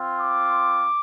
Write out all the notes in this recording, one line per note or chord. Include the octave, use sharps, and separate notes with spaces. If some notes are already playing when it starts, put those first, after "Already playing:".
Already playing: C4 F4
D6